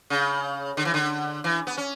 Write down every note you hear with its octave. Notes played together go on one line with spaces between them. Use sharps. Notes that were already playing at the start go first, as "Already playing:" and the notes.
C#3
D3
E3
D3
E3
B3
C#4